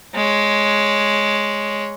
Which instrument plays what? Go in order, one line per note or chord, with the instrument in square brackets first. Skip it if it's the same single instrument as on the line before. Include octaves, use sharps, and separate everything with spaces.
[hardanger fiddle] G#3 C#5